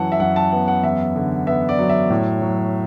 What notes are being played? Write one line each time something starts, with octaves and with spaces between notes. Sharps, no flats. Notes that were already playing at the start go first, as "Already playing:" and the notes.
Already playing: F#2 E3 F#5 A5
E5
F#2 F#5
A5
B3 F#5
F#5
E2 E5
D3
B3 E5
D5
F#3
E5
A2
F#3